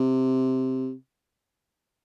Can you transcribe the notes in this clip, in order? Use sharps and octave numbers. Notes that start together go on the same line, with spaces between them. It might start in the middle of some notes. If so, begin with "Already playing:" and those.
Already playing: C3